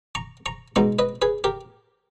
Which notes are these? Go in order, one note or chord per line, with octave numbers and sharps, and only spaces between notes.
A#5 C#6
A#5 C#6
B2 G#3 D#4 A#5 C#6
B4 D#5
G#4 B4
G4 A#4